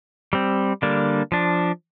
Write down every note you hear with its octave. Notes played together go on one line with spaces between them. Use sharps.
G3 C4
D3 G3 A#3 D4
F3 D4